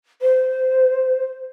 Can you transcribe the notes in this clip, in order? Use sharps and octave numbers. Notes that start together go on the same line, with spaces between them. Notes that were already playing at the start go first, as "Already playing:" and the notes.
C5